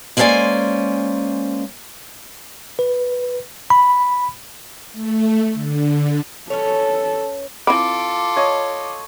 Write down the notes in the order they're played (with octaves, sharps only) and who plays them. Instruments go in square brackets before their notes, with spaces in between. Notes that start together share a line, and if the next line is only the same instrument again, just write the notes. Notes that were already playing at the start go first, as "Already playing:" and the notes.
[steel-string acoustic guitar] G#3 A#3 C#4 C5 D5 G#5
[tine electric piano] B4
B5
[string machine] A3
D3
[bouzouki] C#4 B4 C#5 [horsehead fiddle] A4
[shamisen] E3 C4 B5 [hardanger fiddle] F4 A4 [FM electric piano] D6
[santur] C#5 D#5